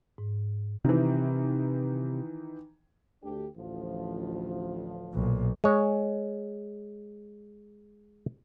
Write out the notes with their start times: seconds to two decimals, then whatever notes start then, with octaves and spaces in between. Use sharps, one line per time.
0.18 G#2
0.85 C3 D#3 E3
3.23 D2 D4 G4
3.56 A1 D2 F3
5.12 B1 A#2
5.64 G#3 C#5